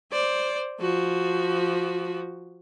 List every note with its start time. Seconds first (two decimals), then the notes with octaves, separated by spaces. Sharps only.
0.11 C5 D5
0.80 F3 F#4